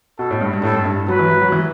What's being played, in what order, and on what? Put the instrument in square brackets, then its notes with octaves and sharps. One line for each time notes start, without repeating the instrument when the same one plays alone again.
[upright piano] B2 [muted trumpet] A4
[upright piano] A2
G2
G2
[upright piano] A2 [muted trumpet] A4
[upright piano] G2
G2
[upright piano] F#3 [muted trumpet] B4
[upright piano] E3
F#3
F#3
E3